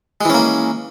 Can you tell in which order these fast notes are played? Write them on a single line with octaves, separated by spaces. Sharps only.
G#3 E3 C#4 A#3